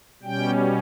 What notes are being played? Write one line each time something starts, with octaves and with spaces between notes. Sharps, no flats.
B2 G3 C#4 G5